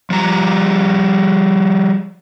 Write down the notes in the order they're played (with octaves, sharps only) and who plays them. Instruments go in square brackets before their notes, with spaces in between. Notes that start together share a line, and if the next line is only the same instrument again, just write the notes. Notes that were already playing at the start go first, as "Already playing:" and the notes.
[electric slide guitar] F3 G3 A#5